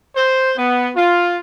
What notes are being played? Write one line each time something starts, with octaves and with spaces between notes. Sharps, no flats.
C5
B3
F4